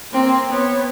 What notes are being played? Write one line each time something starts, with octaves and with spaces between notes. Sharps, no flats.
A#3 C4
B3 C#5